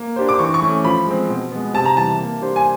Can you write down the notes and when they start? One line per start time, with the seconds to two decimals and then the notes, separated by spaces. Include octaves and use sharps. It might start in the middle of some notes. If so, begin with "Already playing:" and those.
Already playing: A#3
0.16 D4 G4 C5
0.29 D6
0.39 E3 C#6
0.54 C#6
0.62 A3 C#4
0.84 F3 B5
1.07 G#3 C4
1.29 B2
1.51 G#3 B3
1.74 C3 A5
1.85 A#5
1.96 E3 G3 A5
2.19 A#3
2.41 D4 G4 C5
2.56 G#5